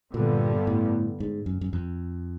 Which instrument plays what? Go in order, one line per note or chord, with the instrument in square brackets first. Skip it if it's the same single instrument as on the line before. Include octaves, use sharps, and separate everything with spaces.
[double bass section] G2 D3 G3 B3 [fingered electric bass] A#2
[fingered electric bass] A2
G#2
F#2
F#2
F2